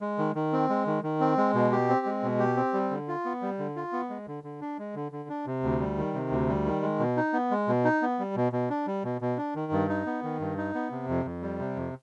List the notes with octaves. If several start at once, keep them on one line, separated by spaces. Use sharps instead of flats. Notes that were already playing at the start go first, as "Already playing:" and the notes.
G#3
D#3
D#3
C4
G#3
D#3
D#3
C4
G#3
B2
G4
C4
G#3
B2
G4
C4
G3
D3
F4
B3
G3
D3
F4
B3
G#3
D3
D3
D4
G#3
D3
D3
D4
C3
D2
G3
D#3
C3
D2
G3
D#3
G#3
B2
D#4
B3
G#3
B2
D#4
B3
G3
B2
B2
D4
G3
B2
B2
D4
D#3
G2
D#4
B3
D#3
G2
D#4
B3
C3
F2
F2
G3
C3
F2